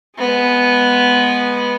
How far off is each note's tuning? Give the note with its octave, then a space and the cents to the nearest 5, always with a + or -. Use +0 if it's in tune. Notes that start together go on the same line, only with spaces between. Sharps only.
G#3 +0 B3 -5